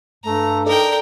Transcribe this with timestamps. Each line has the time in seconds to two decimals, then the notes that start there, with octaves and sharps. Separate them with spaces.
0.24 G2 A3 A#5
0.66 D#4 A4 A#4 D5 G5